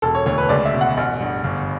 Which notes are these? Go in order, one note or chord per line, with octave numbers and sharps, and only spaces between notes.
E1 A4
C#5
D2 C#5
B4
C#2 D5
E5
B2
F#5
A1
G2
G1